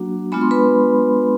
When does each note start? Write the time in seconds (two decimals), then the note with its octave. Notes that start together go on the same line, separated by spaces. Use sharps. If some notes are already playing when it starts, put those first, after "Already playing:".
Already playing: F#3 A#3 D4 F#4
0.32 G#3 B3 D4 F4 B5
0.41 C6
0.51 B4 B5